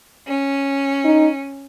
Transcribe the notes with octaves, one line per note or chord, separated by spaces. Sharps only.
C#4
D#4